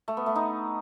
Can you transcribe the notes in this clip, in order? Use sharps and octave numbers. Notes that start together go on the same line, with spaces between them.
A3
B3
A3
D#4